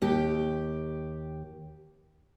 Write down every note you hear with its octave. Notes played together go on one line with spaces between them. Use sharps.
D#2 G4